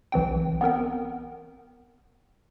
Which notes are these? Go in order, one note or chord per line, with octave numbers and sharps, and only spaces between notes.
B1 E3 C4 G5
B3 C4 A#4 G5